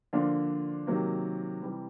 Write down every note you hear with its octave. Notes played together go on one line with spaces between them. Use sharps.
D3 F3 A#3 D4 F4
C3 D#3 F#3 A#3
C3 E3 G3